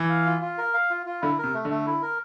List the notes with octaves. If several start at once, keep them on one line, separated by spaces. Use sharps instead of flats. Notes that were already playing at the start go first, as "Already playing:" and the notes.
Already playing: E3
F5
F4
F4
A#4
F5
F4
F4
D3 E4
A#4
C3
A3
D3
A3
E4
A#4